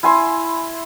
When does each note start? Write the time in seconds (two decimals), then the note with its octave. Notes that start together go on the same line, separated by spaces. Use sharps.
0.03 E4 G#5 C6